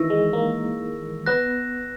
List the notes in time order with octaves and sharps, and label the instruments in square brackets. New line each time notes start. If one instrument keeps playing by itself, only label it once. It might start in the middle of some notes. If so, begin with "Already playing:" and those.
Already playing: [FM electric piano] D#3 E3 [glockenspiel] C#6 E6 A#6
[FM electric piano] G#3
A#3
[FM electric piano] B3 [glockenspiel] F#6 A#6 E7